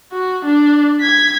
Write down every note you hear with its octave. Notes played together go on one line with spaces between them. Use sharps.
F#4
D4
G#6 B6